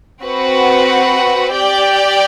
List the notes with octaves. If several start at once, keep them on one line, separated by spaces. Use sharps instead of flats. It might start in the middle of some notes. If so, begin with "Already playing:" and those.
C4 F#4 B4 F#5
G4 D5 G5